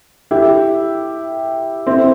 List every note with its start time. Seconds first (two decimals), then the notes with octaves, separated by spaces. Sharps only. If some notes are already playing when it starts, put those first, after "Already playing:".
0.31 E4 G4
1.87 C4 E4